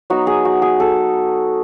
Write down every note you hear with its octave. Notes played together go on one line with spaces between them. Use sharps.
F#3 B3 D#4 F#4
G#4
F#4
G#4
A4